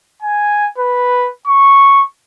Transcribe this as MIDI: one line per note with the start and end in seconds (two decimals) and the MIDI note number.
0.22 0.69 80
0.78 1.30 71
1.47 2.03 85